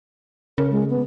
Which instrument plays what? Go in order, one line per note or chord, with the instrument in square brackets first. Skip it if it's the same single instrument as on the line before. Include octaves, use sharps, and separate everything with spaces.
[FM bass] C#3 [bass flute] A#4
[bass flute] G#3
B3